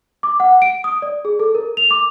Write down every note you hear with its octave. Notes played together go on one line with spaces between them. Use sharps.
D6
F#5
D7
D#6
D5
G#4
A4
A#4
F7
D6